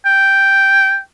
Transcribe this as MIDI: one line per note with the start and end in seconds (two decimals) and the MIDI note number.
0.06 0.99 79